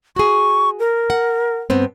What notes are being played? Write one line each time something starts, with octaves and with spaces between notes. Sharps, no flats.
F#4 G#4 C#6
A#4
F#5
G2 B3 C4